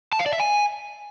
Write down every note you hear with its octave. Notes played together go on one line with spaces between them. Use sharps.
A5
F5
D5
E5
G#5